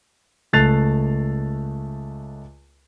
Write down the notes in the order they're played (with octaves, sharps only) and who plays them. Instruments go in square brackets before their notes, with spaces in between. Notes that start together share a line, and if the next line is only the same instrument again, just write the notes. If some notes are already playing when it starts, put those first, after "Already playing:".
[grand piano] C#2 A3 F#6 A6 C7 F7